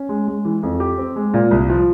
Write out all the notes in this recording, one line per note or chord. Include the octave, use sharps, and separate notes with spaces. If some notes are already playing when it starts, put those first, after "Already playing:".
Already playing: C#4
G#3
G#3
E3
F2
G4
C4
G#3
A#2
C2
F3